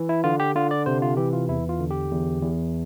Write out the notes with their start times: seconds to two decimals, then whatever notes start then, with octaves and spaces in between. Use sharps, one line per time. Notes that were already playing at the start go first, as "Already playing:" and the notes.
Already playing: E3
0.09 E4
0.24 D3 F4
0.40 G4
0.56 D3 F4
0.71 D5
0.86 C3 C5
1.02 F4
1.17 E3 G4
1.33 F4
1.48 E2 E4
1.69 F4
1.80 D3
1.91 G4
2.11 E2
2.42 E2